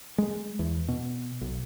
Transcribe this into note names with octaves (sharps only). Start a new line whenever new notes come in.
G#3
E2
B2
B1